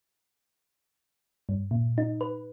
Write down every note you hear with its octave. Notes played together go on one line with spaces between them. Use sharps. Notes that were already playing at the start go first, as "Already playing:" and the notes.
G2
A#2
D#4
B4